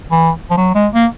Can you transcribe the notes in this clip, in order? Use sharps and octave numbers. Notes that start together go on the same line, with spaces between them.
E3
F3
F#3
G#3
A#3